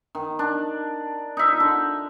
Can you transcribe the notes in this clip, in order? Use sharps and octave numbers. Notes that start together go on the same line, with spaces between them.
D#3
D4
D#4 E5
D3